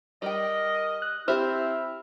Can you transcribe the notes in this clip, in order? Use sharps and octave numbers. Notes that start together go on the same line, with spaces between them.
G3 A#4 D#5 G5
F#6
C4 E4 G4 C5 E5 F6